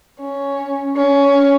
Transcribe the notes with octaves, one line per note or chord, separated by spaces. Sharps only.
C#4
C#4